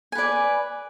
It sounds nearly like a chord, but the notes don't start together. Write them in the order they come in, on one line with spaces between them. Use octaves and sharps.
G#5 B4 D5